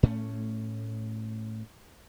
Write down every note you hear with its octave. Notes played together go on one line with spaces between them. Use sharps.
A2 A3 C#4